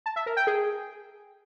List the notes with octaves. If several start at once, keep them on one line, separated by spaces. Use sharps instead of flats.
A5
E5
A#4
G5
G#4